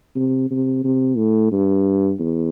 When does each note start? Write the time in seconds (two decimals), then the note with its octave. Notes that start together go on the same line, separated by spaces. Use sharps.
0.15 C3
0.50 C3
0.84 C3
1.17 A2
1.52 G2
2.19 E2